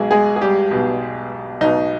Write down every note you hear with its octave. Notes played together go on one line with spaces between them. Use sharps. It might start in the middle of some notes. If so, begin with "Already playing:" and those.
Already playing: B1 B2 G#3 G#4
G#3 G#4
G#4
G3 G4
B1 B2
B1 B2 D#4